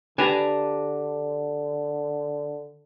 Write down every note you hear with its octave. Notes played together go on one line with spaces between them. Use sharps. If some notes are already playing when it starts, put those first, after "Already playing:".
D3 D4 G4 B4 G#5 A#5